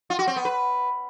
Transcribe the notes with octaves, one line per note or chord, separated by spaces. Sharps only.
F4
F#4
C4
B3
B4